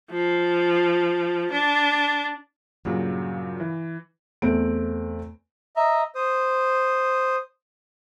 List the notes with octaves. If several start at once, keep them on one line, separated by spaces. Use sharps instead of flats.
F3
D4
G2 A#2 C#3 F#3
E3
E2 A3 C4 D7
D#5 E5 A#5
C5 D#6